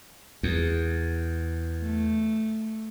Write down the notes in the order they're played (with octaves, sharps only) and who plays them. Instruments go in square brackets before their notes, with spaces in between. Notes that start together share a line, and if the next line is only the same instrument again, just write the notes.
[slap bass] E2
[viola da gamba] A3